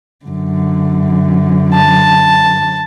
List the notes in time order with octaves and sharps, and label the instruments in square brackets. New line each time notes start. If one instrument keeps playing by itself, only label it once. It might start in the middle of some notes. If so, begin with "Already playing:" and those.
[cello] F#2 D3
[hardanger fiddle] A5